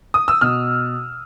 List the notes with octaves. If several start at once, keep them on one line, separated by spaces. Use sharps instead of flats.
D#6
E6
B2 F6